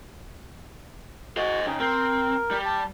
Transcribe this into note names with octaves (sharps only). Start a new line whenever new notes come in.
F#4 C5 D#5
C#3 D#4 G5
C4 A#4
G3
A5